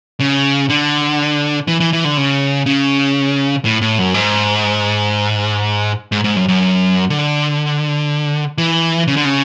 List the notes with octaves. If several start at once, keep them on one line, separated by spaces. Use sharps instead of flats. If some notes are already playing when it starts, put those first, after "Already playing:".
C#3
D3
E3
E3
E3
D3
C#3
C#3
A2
A2
F#2
G#2
G#2
G#2
F#2
F#2
D3
E3
C#3
D3
C#3